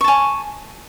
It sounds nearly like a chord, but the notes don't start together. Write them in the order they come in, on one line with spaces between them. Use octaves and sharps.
C#6 A5 G#5